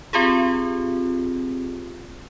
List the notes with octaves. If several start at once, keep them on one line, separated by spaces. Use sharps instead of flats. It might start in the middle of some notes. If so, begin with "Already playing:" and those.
C4 F4 G4 G#4